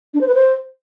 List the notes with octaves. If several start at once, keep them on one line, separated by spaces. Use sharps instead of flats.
D4
C5
B4
C5